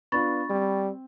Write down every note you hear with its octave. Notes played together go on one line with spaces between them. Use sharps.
B3 D4 F4 B5 C#6 A6
G3 C4